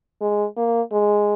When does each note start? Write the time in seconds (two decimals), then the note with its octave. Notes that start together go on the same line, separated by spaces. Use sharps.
0.21 G#3
0.57 A#3
0.92 G#3